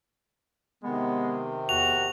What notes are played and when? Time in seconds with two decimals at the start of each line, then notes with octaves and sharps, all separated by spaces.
0.84 C3 D#3 G#3 B3
1.69 E2 F#4 F7